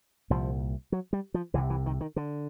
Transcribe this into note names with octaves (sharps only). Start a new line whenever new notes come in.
C2 A#2 F3
F#3
G3
F3
C2 C3 E3
E3
D#3
D#3
D3